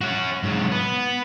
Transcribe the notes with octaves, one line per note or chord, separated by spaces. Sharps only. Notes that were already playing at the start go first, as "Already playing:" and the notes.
C#4 F#4
G#2 F#3
B3